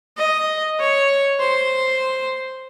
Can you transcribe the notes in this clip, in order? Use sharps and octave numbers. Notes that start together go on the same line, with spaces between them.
D#5
C#5
C5